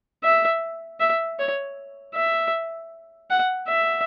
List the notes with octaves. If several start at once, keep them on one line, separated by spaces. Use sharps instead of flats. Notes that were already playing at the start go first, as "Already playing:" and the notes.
E5
E5
C#5
E5
F#5
E5